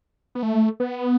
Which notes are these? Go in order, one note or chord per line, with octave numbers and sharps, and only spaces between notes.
B3
A3
B3